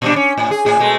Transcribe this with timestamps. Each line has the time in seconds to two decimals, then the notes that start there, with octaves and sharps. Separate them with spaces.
0.02 A#2 G3 D4
0.16 C#4
0.38 A2
0.51 G#4
0.65 A2 G#4
0.79 B2 G#3 A3